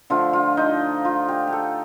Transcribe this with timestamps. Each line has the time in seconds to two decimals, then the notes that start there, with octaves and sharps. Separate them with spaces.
0.10 D3 F3 A3 F4
0.33 F4
0.57 D#4
1.05 F4
1.28 G4
1.47 G4
1.53 A4